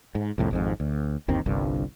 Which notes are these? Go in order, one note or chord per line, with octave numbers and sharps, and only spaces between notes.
G#2
C2 F2 A2
G#1 F2 G#2
D2
G1 D#2 D#3 C4
G1 C2 G2